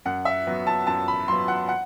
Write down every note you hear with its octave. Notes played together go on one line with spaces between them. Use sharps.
F#2 F#5
E5
F#3 B3
A5
F#2 A5
B5
F#3 B3 C6
F#5
F#5